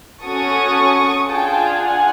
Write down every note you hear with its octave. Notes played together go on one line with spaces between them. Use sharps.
C#4 F#4 A4 C#6 D#6
D4 F4 G#4 G5 A5
F#5 G#5